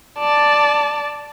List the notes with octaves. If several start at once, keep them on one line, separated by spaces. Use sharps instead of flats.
D5 A5